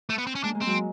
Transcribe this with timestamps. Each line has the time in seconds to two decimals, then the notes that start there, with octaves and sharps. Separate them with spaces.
0.10 A3
0.18 B3
0.27 C4
0.35 C#4
0.44 G#3 A#3 D4
0.55 G#3 A#3
0.61 C4
0.66 F#3 G#3